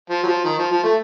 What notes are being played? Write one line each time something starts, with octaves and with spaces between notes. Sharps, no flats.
F3
F#3
F3
D#3
F3
F3
A3